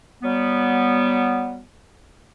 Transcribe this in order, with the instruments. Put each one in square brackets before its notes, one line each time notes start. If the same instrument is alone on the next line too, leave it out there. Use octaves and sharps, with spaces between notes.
[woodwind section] F#3 G3 B3